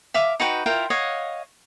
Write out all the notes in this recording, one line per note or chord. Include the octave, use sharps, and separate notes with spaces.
E5 F5 D6
D#4 F#4 B4 G5
E4 F4 A#4 G5
C#5 D#5 F5 F#5